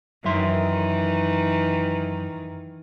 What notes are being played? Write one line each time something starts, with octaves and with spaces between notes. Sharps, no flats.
F#2 D#3 E3 E5 C6